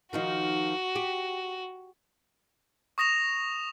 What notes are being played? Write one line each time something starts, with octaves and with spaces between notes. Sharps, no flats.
D#3 F3 D#4 F#4
G4
C#6 D#6 A#6 E7 F7